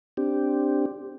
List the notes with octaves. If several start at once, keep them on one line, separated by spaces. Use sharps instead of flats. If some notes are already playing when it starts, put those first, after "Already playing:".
C4 D4 G4